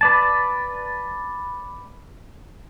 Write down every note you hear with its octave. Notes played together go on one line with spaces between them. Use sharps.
B4 D5 A5